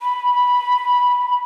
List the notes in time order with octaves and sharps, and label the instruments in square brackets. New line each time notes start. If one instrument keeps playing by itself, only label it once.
[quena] B5